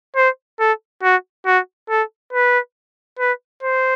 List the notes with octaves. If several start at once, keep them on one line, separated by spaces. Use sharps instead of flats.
C5
A4
F#4
F#4
A4
B4
B4
C5